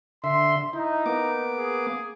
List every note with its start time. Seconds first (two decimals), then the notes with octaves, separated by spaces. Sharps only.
0.24 D3 E5 C6
0.73 D#4 E4
1.06 A#3 B3 D6
1.58 G#4